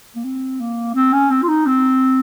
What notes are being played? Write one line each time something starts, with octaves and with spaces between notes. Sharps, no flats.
A#3
C4
A#3
C4
C#4
C4
F4
D#4
C4